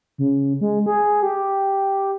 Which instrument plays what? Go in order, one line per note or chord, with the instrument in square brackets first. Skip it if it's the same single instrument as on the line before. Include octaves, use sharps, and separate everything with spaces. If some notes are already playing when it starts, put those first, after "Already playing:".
[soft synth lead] C#3
G#3
G#4
G4